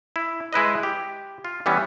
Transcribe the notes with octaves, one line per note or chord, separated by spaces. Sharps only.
E4
G#3 E4 B4 D#5
G4
F4
E3 G3 B3 C#4